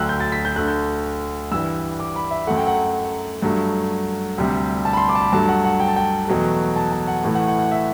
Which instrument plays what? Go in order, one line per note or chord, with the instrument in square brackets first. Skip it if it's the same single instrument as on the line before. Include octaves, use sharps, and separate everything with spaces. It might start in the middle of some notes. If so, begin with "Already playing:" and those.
Already playing: [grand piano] D2 D3 F#3 A3 G5 E6 F#6
G6
A6
B6
G6
D2 D3 A3 F#6
G6
G2 E3 G3 E6
D6
B5
E5
F#2 F#3 A3 F#5
G5
F#5
G2 F#3 A3
D2 C3 G3
A5
B5
C6
D6
A5
B5
G2 F#3 A3 A5
F#5
F#5
G5
A5
G5
E2 B2 F#3 A3
A5
A5
F#5
A2 E3 A3
F#5
F#5
F#5
E5